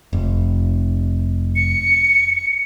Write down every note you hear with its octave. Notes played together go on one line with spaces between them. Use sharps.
F1
C#7